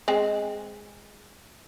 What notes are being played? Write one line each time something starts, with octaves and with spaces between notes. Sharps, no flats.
G#3 C4 G#4